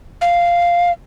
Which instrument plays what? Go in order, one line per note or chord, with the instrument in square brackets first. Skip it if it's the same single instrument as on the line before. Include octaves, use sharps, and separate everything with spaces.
[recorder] F5